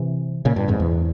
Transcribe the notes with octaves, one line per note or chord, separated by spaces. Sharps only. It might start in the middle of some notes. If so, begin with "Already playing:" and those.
Already playing: C3 E3
A#2 C#3
G2 A#2
F2 G#2
E2